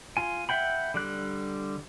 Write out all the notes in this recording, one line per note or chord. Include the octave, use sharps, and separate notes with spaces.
F4 G#5
E5 F#5 G5 B5
D3 G3 F#6